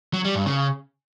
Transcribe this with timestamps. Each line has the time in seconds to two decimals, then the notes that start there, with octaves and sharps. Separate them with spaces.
0.14 F#3
0.24 G3
0.35 G2
0.46 C#3